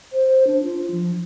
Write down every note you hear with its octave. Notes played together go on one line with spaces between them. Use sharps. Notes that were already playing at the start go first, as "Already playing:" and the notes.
C5
D4
F4
F3